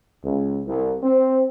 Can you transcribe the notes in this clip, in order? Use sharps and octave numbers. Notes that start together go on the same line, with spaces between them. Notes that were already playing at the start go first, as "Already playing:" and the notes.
C#2
C2
C4